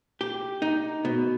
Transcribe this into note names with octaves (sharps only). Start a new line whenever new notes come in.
G4
D#4
B2